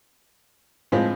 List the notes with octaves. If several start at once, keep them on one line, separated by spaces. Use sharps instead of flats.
A2 F3 G#3 C4